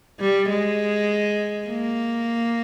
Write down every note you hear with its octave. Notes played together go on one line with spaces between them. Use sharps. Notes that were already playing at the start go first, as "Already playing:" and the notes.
G3
G#3
A#3